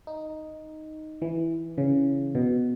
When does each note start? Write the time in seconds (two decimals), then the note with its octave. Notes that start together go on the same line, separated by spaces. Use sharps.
0.07 D#4
1.22 E3
1.78 C#3
2.35 B2